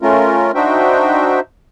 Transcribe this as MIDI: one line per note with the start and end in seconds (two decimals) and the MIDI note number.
0.02 0.52 57
0.02 0.52 61
0.02 0.52 65
0.02 0.52 70
0.55 1.40 62
0.55 1.40 63
0.55 1.40 66
0.55 1.40 72
0.55 1.40 76
0.55 1.40 79